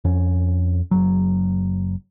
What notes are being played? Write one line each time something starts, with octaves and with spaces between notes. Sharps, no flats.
F2 C#4
F#1 F#3